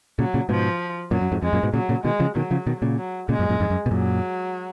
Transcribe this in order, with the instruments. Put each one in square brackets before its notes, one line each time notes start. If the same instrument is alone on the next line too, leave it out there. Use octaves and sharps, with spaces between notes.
[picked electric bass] A#2 C#3 [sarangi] F#3
[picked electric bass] A#2 C#3
[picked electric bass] G#2 B2 [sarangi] F3
[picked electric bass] F#2 A#2 [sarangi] F#3
[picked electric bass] F#2
F2 G#2
[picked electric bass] F2 [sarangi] G#3
[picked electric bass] F#2 A#2
G#2 B2
[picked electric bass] A#2 C#3 [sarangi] F#3
[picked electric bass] A#2 C#3
[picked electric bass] B2 D#3 [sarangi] G#3
[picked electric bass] C#3 F3
[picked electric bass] B2 D#3 [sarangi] F#3
[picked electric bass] C#3 F3
B2 D#3
A#2 C#3
[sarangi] F#3
[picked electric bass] A#2 C#3 [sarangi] G#3
[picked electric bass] F#2 A#2
F#2 A#2
F2 G#2
F#2
B2
[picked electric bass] F#2 A#2 [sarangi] F#3